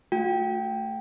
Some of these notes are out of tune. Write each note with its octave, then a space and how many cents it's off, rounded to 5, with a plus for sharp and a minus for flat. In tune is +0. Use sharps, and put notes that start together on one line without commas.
A3 +0 F#4 -45 G5 +0